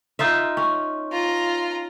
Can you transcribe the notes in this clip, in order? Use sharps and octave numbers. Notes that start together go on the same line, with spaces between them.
D#4 F4 E5
C#4
F4 A#5